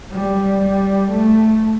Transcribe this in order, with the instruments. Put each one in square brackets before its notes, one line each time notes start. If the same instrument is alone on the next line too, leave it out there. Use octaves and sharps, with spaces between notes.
[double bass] G3
G3
A3